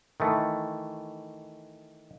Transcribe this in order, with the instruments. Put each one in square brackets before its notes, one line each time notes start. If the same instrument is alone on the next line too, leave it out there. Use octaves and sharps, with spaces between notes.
[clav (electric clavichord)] D#3 E3 A3